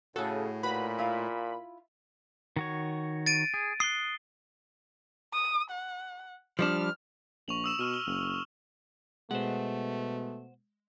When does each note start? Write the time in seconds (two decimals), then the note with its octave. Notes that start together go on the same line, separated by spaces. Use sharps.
0.16 A2 C#3 F#4 G#4 A4
0.63 A#2 F#4 B4 B5
0.98 E4 F4
2.56 D#3 F#4 C#5
3.26 A6 D7 D#7
3.54 G#4
3.80 D#6 F#6 C7 G7
5.33 D#6
5.71 F#5
6.59 F3 G3 D4 F6
7.48 A#1 C#6 F7 F#7
7.64 D#6 E6 E7
7.79 B2 C#6 F6 D#7
7.94 G7
8.07 F#1
9.31 B2 G#3 A3 C5 F#5